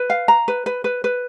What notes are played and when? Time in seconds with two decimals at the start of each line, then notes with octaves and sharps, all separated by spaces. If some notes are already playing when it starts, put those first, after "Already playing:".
Already playing: B4
0.10 F5
0.28 A#5
0.48 B4
0.66 B4
0.84 B4
1.04 B4